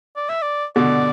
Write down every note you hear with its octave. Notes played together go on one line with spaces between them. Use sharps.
D5
E5
D5
B2 D3 D5